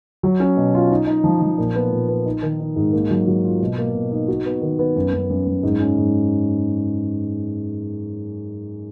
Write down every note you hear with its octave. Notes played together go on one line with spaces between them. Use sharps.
F#3
C#4
B2
F4
D#4
D#4
F3
F3
A#2
B3
A#2
B3
D#4
D#3
D#4
G#2
A#3
F#3
F#3
F4
B2
A#3
B2
D#4
F#4
B3
D#3
B3
F#2
F#2
F#2
F#2
G#2
C#4
G#2